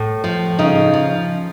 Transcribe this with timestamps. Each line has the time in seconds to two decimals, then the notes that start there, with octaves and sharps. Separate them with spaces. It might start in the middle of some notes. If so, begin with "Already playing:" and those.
Already playing: A2
0.24 F3
0.59 C#3 D#4
0.93 F3